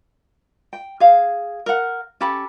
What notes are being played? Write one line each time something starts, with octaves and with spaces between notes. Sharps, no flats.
G5
G#4 F5
A#4 F#5
C#4 G4 A4 B5